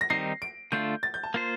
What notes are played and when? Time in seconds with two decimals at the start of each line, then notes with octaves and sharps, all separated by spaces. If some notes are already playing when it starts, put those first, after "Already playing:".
0.01 A#6
0.10 D#3 G3 C4 D#4 C7
0.42 D7
0.72 D3 A3 D4 F4 G6
1.03 A6
1.14 G6
1.23 A5
1.34 A#3 F4 C5